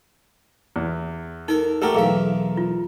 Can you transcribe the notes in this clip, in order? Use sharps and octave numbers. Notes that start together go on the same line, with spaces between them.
E2
D#4 A4 A#4
A3 F#4 G4 A4 A#4
B1 E2 G#4 E5 F5
F4